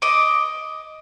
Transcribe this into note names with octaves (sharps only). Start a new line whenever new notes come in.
D#5 D6